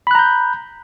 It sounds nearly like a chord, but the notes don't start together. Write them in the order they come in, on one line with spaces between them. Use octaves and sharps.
B5 F#6 A#5 G6